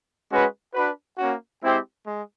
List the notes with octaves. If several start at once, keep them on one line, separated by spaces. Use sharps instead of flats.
G#3 C#4 F#4 B4
D4 F#4 B4
A#3 C#4 F#4
G#3 C4 E4 G4 C5
G#3